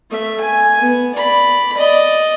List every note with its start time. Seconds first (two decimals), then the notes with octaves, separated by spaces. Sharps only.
0.10 A3 E5
0.40 G#5
0.79 B3
1.14 D5 B5
1.77 D5 D#5